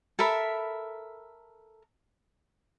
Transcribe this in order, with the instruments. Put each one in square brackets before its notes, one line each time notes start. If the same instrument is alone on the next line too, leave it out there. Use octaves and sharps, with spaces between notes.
[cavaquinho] A4 A#4 E5 B5